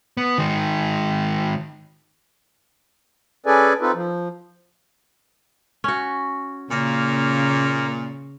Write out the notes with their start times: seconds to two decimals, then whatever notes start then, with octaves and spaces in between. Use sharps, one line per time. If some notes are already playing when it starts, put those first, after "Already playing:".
0.17 B3
0.38 D#3 G#3
3.46 C#4 G#4 A4 B4 D5 G#5
3.81 C4 D#4 F4 A4 B4
3.94 F3
5.84 C#4 F#4
6.71 A#2 C#3 A#3